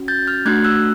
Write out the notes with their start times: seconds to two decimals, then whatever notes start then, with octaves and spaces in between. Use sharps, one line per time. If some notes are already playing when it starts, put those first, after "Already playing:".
Already playing: C#4 F#4
0.08 G6 A6
0.27 F6 G6
0.45 A3 D4 F#4 F#6 G#6
0.64 E6 F#6